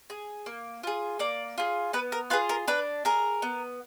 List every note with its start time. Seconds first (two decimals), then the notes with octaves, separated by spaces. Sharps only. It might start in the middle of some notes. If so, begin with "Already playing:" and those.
0.10 G#4
0.46 A#3
0.83 F4 G#4
1.19 A#3 D5
1.58 F4 G#4
1.93 B3 B4
2.12 A#4
2.30 F4 G#4 B4
2.49 A#4
2.67 D4 B4
3.05 G#4 A#4
3.42 B3